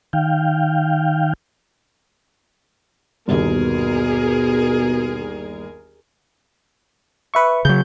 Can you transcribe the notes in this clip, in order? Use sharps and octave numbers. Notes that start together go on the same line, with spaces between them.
D#3 F5 G5
G1 D#2 B2 G#4 A#4
B4 E5 C#6
C#3 F#3 G6